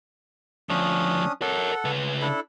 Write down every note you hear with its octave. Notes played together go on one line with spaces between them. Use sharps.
D2 F3 C#4 D4 D#6
A4 A#4 C#5 F#5
C#3 B4
D4 E4 A4